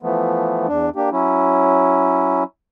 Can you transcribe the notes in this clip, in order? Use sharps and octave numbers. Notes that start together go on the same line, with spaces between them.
E3 F3 A3 B3
E2 D4
A#3 D4 G4
F#3 C#4 E4